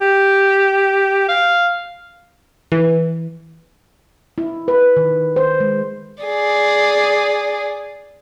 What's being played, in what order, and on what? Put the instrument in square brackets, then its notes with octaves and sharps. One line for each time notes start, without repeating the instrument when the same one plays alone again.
[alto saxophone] G4
F5
[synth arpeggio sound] E3
[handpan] E4
B4
D#3
C5
G#3
[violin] G#4 D5